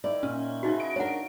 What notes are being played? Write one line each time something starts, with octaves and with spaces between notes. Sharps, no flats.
D#3 E4 D5
A#2 C#4
C#3 E3 F#3 D#4 F#4
D#5 D7
D4 A#4 C#5 F#5